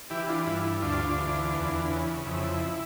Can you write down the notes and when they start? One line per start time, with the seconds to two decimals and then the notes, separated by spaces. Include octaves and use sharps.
0.10 E3 E4 G4
0.28 D4 F4
0.46 G2 E4
0.64 E4
0.82 D2 D4 F4
1.18 E3
1.54 E2
1.90 C#3
2.26 F2 E4